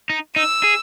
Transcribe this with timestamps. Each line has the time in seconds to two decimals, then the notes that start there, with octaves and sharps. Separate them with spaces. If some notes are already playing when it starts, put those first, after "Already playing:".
0.10 D#4
0.36 D#4 E6
0.63 G#4